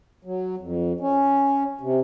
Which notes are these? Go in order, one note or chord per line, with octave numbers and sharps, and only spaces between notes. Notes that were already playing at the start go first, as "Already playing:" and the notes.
F#3
F2
C#4
C3